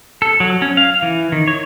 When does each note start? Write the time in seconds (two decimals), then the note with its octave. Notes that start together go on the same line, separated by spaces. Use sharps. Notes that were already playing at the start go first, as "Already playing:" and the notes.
0.22 A4
0.40 F#3
0.62 C#4
0.77 F5
1.02 E3
1.32 D#3
1.48 C#5